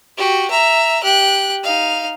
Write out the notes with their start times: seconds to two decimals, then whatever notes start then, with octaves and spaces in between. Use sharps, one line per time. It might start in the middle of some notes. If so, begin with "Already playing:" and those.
0.17 F#4 G4
0.51 E5 A#5
1.03 G4 F#6
1.64 D#4 F5